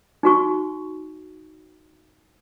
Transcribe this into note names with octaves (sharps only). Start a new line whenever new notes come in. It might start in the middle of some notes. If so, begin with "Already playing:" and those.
D#4 F#4 C#6